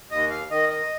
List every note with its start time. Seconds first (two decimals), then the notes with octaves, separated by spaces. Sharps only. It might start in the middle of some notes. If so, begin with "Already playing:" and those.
0.11 D#2 D#5
0.30 F5
0.50 D#3 D#5
0.71 D#5